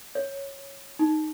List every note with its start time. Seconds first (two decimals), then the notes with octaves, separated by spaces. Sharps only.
0.15 C#5
0.99 D#4